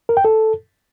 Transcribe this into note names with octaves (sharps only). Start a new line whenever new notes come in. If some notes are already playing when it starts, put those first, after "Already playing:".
A#4
G5
A4